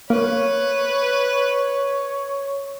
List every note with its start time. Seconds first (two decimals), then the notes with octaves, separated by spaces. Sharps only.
0.10 A#3 B4 C#5